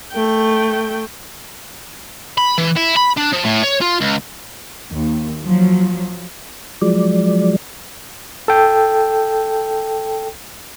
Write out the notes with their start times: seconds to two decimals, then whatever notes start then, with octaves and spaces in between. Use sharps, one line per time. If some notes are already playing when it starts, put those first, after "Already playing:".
0.13 A3 G5
2.38 B5
2.58 E3
2.76 E4
2.96 B5
3.17 D4
3.32 F3
3.44 A2
3.63 C#5
3.81 F4
4.01 C#2
4.93 D#2
5.44 F3 F#3
6.82 F3 F#3 G#3 D5
8.48 A4 G5